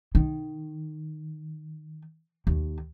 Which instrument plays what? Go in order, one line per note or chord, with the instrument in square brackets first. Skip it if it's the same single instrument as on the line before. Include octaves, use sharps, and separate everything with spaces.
[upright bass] D#3
D#2